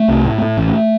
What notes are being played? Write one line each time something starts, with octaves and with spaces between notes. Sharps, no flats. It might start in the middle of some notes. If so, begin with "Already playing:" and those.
Already playing: A3
C2
A2
A2
A1